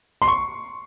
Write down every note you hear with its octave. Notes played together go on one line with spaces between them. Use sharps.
C6
C#6